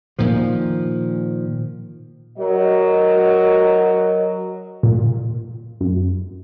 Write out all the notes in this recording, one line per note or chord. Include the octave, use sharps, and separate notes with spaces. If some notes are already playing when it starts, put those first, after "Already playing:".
A#2 D#3 F3
F#3 F#4 A#4 D#5
A#2
F#2